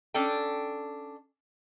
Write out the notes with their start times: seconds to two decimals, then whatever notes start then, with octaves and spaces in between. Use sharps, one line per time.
0.14 C#4 D4 A4 G5